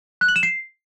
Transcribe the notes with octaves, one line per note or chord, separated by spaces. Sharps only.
F#6
F#7
E7
C7